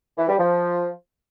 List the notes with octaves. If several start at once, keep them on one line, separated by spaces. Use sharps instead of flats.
E3
G3
F3